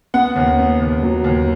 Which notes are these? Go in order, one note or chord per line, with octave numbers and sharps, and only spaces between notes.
B3 F#5
D#2
B3
D#2
F#3
D#2